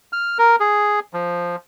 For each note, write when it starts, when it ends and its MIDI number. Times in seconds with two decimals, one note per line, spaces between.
0.13 0.38 89
0.38 0.56 70
0.60 1.00 68
1.13 1.56 53